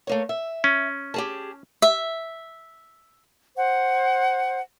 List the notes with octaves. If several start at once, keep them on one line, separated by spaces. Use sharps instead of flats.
A3 A#3 C#5
E5
C#4
G4 G#4 A5
E5
C5 F#5